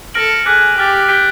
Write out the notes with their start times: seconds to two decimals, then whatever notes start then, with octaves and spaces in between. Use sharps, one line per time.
0.14 A4 F6 A#6 D7 F#7
0.46 G#4 D6 F#6 B6
0.77 G4 D6 F6 A6
1.08 G6 B6 D7 G7